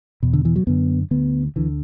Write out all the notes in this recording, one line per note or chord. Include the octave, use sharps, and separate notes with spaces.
E2 B2
D3
E3
F#3
F#2 D3 B3
D2 D3 B3
D2 D3 E3